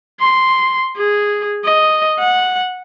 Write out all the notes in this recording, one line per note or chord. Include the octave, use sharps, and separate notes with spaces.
C6
G#4
D#5
F#5